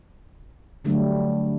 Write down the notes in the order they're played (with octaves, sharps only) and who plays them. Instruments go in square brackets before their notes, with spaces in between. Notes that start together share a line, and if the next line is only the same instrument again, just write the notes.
[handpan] D3 F#3 G3 A3 D4